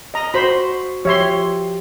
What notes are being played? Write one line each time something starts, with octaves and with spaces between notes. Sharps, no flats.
D#5 A#5
F#4 C5 B5
F3 G4 C#5 E5 C6